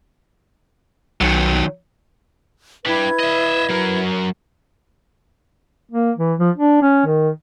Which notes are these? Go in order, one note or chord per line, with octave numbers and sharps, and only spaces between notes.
B1 D#3 F#3
D4 E4 G4 B4 G#6
D#5 E5
F#3 A#4
A#3
E3
F3
D4
C#4
D#3